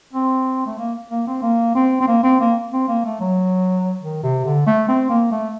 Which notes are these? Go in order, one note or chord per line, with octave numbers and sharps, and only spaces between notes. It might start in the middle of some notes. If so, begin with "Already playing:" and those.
C4
A3
A#3
A#3
C4
A#3
C4
C4
A#3
C4
A#3
C4
A#3
A3
F#3
D#3
C3
D3
A3
C4
A#3
A3